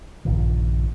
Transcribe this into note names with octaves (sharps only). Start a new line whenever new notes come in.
A#1 G2 A#2 D#3